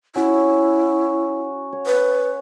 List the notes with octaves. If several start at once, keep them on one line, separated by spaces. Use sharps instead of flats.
C#4 E4 F#4
C#5
B4